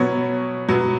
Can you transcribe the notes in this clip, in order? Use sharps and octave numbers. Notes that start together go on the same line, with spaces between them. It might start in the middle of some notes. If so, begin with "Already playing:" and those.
Already playing: B2 F#3 B3 C#5
B2 F#3 B3